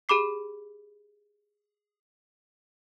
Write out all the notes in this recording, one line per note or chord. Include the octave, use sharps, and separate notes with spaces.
G4 G#4 B5 D6 C7